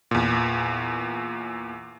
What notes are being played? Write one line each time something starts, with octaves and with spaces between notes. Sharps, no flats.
E2 A#2